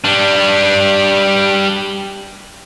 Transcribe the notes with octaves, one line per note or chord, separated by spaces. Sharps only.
G3 D4